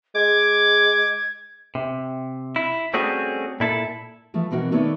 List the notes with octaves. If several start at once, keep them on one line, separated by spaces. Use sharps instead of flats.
G#3 D6 G#6
C3
E4
G3 A3 C4 C#4 F#4 G#4
A#2 E4 A4
E3 F3 A3
B2 E3 C4 F#4 A#4
D#3 A3 B3 A4 C#5 D5